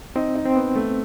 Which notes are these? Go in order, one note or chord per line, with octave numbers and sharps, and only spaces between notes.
C4 D#4
D#4
C4
B3
A3